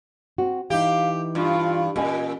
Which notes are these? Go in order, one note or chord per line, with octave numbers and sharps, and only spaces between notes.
C4 F#4
E3 D#4 G4 F5
G2 F4
A#2 C#4 A#4 D#5 G#5